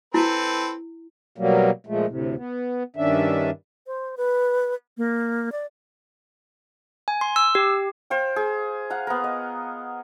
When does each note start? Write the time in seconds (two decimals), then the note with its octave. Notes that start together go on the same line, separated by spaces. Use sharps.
0.14 C4 E4 A4 B4
1.38 B2 F#3 G3 A#3
1.87 A#2 F3 G#3 A3
2.07 D2 A2 C3
2.36 B3
2.96 G2 D#3 C#4 D4 E5
3.87 C5
4.17 B4
4.98 A#3
5.52 D5
7.08 G#5
7.21 C6
7.36 E6
7.55 G4
8.10 C5 F5 G5
8.36 G#4
8.90 F5 F#5 A#5
9.07 B3 A#4
9.24 D#5